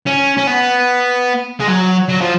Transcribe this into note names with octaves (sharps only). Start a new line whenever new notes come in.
C#4
C#4
B3
G#3
F#3
F#3
F3